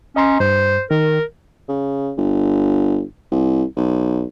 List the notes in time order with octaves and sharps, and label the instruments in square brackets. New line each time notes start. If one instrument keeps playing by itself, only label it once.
[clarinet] C#4 [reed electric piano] D#5 A#5 C6
[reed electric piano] G2 [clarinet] C5
[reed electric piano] D#3 [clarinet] A#4
[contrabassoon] C#3
G1
C2
B1